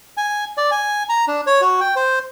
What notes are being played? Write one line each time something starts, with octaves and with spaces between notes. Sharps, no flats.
G#5
D5
G#5
A#5
D4
C#5
F#4
G5
C5